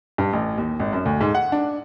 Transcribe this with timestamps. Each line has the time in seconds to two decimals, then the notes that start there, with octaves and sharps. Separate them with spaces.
0.18 G2
0.33 A1
0.58 D#2
0.80 G#1
0.93 F#2
1.05 D2
1.21 G#2
1.35 F#5
1.52 D4